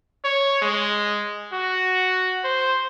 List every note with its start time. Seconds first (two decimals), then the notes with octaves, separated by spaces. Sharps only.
0.24 C#5
0.62 G#3
1.52 F#4
2.44 C5